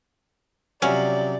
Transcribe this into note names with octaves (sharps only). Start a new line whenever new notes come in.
C3 F3 F#3 C#4 D5